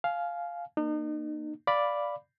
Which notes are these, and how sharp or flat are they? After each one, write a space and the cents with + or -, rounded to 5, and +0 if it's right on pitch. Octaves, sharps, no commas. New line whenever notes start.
F5 +0 G#5 +35
A#3 +0 D#4 -40
D5 +0 F5 +0 B5 +0